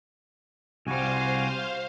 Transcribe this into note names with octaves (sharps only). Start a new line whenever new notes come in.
C2 G3 F#4 C5 F5 G#5